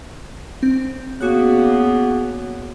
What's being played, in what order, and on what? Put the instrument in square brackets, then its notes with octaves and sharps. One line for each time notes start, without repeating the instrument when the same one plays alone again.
[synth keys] C4
[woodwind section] C#3 A#3 B3 [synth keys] F#4 D6 F#6